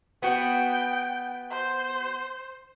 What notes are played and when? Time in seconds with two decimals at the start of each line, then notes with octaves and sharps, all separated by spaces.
0.23 B3 F#4 G5
1.51 C5